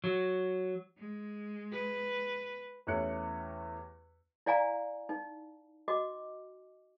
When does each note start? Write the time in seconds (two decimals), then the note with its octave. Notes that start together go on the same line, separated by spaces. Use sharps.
0.04 F#3
0.98 G#3
1.72 B4
2.87 E2 A3 C#4 G4 F#6 C#7
4.46 E4 D5 F5 G#5 A#5
5.09 D#4
5.88 F#4 D#5 D6